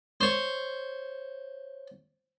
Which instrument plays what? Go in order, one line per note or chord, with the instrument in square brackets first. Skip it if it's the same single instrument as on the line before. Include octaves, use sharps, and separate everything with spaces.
[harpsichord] C5 C#5